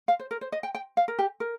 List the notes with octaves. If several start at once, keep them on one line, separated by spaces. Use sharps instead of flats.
F5
C5
A#4
C5
D#5
G5
G5
F5
A#4
G4
A#4